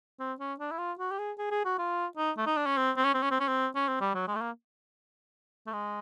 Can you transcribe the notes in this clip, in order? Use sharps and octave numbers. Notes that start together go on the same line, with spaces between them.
C4
C#4
D4
E4
F4
F#4
G4
G#4
G#4
G#4
F#4
F4
D#4
A3
D#4
D4
C#4
C4
C4
C#4
C4
C#4
C4
C#4
C4
C#4
C4
G3
F#3
G#3
A3
A#3
A3
G#3